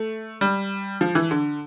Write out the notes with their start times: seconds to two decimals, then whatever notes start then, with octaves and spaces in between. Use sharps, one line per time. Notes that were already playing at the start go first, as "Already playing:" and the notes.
Already playing: A3
0.41 G3
1.01 F3
1.15 E3
1.31 D3